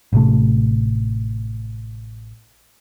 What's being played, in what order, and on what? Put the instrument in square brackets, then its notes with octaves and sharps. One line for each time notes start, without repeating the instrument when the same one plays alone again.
[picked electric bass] A1 C3 A3